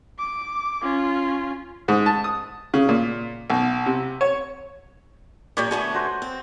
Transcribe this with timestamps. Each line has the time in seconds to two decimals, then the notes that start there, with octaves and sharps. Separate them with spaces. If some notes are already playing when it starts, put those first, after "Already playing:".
0.19 D6
0.82 C#4 F4
1.88 G#2
2.06 A5
2.24 D#6
2.74 C#3
2.89 A#2
3.50 B1
3.86 C3
4.21 C#5
5.57 F#2 A#2 A#3 G4 C#5
5.71 D3 A3 B3 G#5 C#6
5.94 F#4 C5
6.22 C4